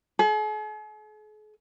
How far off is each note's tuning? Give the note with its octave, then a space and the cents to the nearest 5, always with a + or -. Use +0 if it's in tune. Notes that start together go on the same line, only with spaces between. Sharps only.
G#4 +45